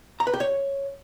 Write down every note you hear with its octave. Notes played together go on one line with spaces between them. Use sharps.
A#5
B4
G4
C#5